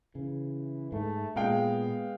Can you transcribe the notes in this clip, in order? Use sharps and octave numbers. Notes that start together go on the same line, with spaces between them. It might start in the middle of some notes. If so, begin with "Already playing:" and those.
C#3 E3
G#2 A3
A#2 G#3 B3 F5 G5